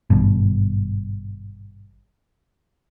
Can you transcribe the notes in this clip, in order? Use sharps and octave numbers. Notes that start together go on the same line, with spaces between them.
G#1 G2 B2